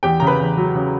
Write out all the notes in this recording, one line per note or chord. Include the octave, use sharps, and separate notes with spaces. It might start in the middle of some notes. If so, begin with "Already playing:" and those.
E2 G4 G5
C#3 A#5
B4 B5
E2
F#3
C#3